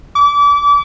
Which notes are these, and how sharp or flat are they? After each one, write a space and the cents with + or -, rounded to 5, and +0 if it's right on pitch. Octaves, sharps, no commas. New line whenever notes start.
D6 -30